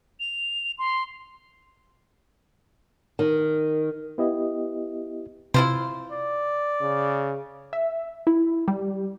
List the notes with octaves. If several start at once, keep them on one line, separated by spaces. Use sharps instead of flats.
F7
C6
D#3
B3 E4 G4 D#5
C3 E4 F4 C5
D5
C#3
E5
E4
G3